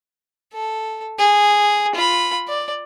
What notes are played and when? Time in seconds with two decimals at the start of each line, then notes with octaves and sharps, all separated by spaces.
0.54 A4
1.19 G#4
1.96 F4 B5
2.48 D5